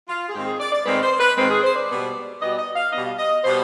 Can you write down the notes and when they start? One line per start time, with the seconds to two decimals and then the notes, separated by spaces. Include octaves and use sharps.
0.08 F4
0.29 G#4
0.34 G#2 D#3 G#3 C4 G4
0.47 G#4
0.60 D5
0.72 D5
0.86 G#2 D#3 G#3 C4 B4
1.02 C5
1.20 B4
1.37 G#2 D#3 G#3 C4 B4
1.50 G#4
1.63 C5
1.76 D5
1.89 B2 G3 B3
2.40 B2 G3 B3 D#5
2.52 D5
2.58 D#5
2.75 F5
2.92 B2 G3 B3 D#5
3.05 F5
3.19 D#5
3.44 B2 G3 B3 C5